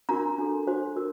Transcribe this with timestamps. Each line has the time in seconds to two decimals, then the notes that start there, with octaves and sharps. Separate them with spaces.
0.09 D4 F#4 A#4 A#5
0.38 D4 F#4 A4
0.67 D4 F#4 C5
0.96 F#4 A#4